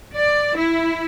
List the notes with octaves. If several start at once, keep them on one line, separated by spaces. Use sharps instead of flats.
D5
E4